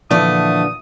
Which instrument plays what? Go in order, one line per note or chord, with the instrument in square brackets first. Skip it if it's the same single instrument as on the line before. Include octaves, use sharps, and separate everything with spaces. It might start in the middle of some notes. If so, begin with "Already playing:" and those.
[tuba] A#2 [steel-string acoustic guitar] D3 E3 F3 [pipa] A3 [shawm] D#6